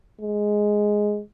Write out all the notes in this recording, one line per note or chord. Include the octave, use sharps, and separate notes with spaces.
G#3